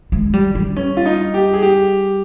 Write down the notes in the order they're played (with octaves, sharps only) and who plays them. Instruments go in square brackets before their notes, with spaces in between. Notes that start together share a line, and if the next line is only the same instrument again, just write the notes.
[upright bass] G#3
G3
G3
[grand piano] C#4
F4
D#4
G4
G#4
G4